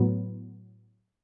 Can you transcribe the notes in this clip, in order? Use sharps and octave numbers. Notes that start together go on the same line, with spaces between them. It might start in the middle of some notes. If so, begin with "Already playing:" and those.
Already playing: A2 F#3 B3